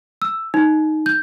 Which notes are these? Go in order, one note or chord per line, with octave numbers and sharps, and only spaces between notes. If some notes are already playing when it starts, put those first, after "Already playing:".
E6
D#4
G6